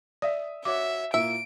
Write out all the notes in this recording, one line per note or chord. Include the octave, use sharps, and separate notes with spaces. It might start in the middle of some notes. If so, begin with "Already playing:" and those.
D5 E5 D#6
F#4 C#5 E5 F#5 D6
A#2 A#3 E4 E5 D7